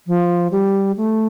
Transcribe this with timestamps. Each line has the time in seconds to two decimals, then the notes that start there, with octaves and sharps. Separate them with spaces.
0.07 F3
0.51 G3
0.97 A3